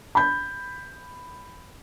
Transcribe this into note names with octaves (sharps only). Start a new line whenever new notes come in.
B5 G6